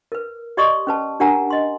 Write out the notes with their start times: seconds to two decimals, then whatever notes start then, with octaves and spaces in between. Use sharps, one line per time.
0.12 A#4 B4
0.57 G4 D5 D#5 C6 C#6 D#6
0.87 C#4 B4 A5
1.20 D4 G4 A#4 F#5 G#5 A#5
1.50 D#5 C6